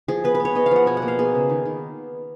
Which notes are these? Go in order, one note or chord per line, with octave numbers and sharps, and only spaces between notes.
F3 G#4
B3 B4
B4
B3
C#5
B3 D#5
F5
F3 F#5
B2 G#5
F#5
A#3
F5
B3 G#4
C#3
D#3
D#3